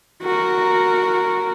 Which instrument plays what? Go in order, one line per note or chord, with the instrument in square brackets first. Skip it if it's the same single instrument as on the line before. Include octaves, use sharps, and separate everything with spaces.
[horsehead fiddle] F#4 A#4